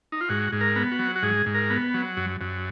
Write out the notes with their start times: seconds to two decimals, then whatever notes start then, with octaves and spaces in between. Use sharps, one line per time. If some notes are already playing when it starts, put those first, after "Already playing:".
0.12 D#4
0.21 F4
0.29 G#2 F#4
0.52 G#2
0.61 A#4
0.76 B3
0.92 F#4
0.99 F#3
1.16 F#4
1.23 G#2 G#4
1.46 G#2
1.55 A#4
1.70 B3
1.94 F#3
2.17 F#2
2.41 F#2